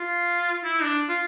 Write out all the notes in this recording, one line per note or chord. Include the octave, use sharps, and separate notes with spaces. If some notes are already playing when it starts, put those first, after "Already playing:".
Already playing: F4
E4
D4
F4